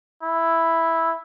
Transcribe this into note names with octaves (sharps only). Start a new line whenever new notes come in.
E4